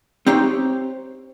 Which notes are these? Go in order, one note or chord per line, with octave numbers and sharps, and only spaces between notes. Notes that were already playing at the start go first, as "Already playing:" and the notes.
C4 D#4 G4 C5 C#5